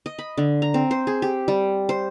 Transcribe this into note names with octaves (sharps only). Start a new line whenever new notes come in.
D#5
B5
D3
A#5
C4
C5
G#4
G4
G3
C5